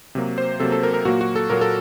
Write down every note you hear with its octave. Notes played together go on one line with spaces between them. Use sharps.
C3 F#3 A#3
C5
C3 F#3 A#3 A4
A4
A#4
A#4
A#2 F#3 A#3 F#4
F#4
A4
A#2 F#3 A#3 A#4
A4